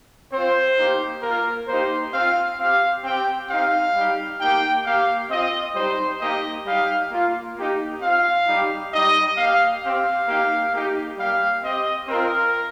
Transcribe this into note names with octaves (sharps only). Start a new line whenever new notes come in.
C4 F4 C5
A#3 D#4 G4
A#3 F4 A#4
A#3 D#4 G4 C5
C4 F4 F5
C4 G4 F5
C4 G4 G5
C4 D#4 G4 F5
G3 D#4 G4
A#3 D#4 G4 G5
A#3 G4 F5
C4 F4 D#5
G3 D#4 G4 C5
A#3 D#4 G4 D#5
G3 D#4 G4 F5
A#3 F4
A#3 D#4 G4
C4 F4 F5
G3 D#4 G4
G3 D#4 G4 D#5
A#3 G4 F5
C4 G4 F5
A#3 D#4 G4
A#3 D#4 G4
G3 A#3 G4 F5
C4 G4 D#5
C4 F4 A#4